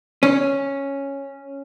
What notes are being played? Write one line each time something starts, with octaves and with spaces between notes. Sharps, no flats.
C#4